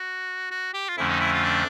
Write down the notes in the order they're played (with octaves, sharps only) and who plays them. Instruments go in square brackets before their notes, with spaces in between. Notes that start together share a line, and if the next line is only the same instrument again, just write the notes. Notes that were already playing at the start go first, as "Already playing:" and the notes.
Already playing: [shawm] F#4
F#4
G4
F4
[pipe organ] F2 D3 F3 A3 C#4 [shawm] E4
[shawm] D#4
E4
F4
D4